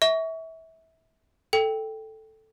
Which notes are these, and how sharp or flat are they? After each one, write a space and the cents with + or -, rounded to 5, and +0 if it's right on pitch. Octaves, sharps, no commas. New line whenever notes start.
E5 -25 C#6 +30
A4 +0 G5 +0